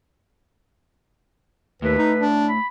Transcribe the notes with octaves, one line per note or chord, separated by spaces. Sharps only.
D#2 A2 B4
D#4
D4
B5